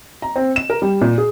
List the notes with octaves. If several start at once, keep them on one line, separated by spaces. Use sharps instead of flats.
A#5
C4
E7
A#4
G3
A#2
G#4